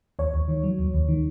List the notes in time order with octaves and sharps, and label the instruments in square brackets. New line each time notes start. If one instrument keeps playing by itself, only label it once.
[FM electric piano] D#2 C#5
D#2
D#3
F#3
D#2
D#2
D#3